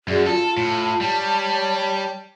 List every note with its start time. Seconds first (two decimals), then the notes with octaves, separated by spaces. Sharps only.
0.08 F#2 F#4 G#4 D5
0.27 F4 A4 A5
0.57 A2
1.01 G3 C#5